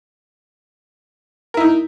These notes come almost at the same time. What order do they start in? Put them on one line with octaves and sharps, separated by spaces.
A#4 E4 D#4